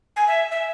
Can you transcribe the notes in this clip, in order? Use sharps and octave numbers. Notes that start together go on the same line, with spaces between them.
G#5
E5
E5